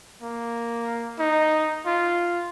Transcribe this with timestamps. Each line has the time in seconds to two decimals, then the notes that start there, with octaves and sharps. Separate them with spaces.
0.22 A#3
1.19 D#4
1.86 F4